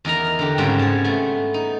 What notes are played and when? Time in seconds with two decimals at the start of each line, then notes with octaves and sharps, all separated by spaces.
0.05 E2 D#4 A#4 A#5
0.39 D3 G4
0.58 G#2 C#3 G3 B3 C4 G5
0.79 G#4 A5
1.04 A3 B3
1.54 D#4